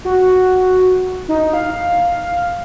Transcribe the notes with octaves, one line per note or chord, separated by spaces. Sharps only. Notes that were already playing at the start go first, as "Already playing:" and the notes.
F#4
D#4
F5